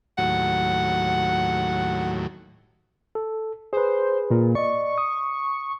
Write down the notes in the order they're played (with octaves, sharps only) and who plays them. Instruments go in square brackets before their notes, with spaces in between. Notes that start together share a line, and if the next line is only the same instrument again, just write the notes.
[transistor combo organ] D#2 A2 F#3 [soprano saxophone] F#5
[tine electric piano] A4
[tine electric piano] G#4 B4 [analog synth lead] C5
[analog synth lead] A#2
[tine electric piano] D5 D#5 [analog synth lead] C#6
[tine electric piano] D#6